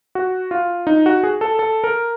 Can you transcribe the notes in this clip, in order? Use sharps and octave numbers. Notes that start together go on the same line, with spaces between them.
F#4
F4
D#4
F#4
G#4
A4
A4
A#4